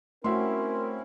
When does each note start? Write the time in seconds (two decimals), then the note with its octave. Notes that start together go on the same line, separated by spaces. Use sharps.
0.24 A3 C4 C#4 E4 F#4 A#4 E5 C6